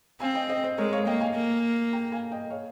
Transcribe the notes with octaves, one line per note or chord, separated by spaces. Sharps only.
C4 F5 G#5
D#5 G5
C5 D#5
C5
G#3 A#4 C#5
C#5 F5
A#3 D#5 G5
F5 G#5
A#3
G5 A#5
F5 G#5
D#5 G5
C#5 F5